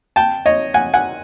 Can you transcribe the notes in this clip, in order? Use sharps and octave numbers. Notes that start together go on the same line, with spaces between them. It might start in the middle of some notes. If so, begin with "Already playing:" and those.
G5 A5
C#5 D#5
F#5 G#5
F#5 G#5